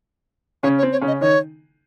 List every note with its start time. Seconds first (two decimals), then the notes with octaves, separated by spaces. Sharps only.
0.63 C#3 C#4 C#5
0.78 C#5
0.83 C4
0.92 C#5
1.02 C#3 C#4
1.07 D#5
1.21 D#3 D#4 C#5